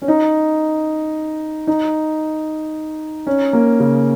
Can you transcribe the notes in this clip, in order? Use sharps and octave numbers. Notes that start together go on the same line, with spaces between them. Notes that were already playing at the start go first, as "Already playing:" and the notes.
C#4
D#4
D#4
C#4
A#3
C#3